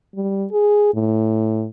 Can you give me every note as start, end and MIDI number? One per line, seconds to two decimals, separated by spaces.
0.15 0.46 55
0.52 0.91 68
0.94 1.67 45